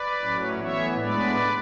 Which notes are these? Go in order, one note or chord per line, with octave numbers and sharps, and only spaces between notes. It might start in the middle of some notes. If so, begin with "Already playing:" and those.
Already playing: B4 D5
A2 F#3 C#4
A2 E3 B3 C#5 E5
A2 G#3 B3 D4 B4 D5